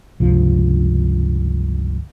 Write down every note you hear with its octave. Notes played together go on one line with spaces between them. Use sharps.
G1 C#2 C3 F3